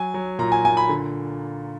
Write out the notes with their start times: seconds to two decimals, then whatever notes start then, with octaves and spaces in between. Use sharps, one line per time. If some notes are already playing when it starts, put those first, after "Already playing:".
Already playing: F#3 G#5
0.14 F#3
0.39 A#2 A#5
0.52 G#5
0.64 A#2 G#5
0.77 B5
0.89 D3